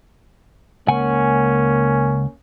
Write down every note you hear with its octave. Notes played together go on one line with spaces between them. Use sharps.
C#2 A#3 C#4 F#5 G#5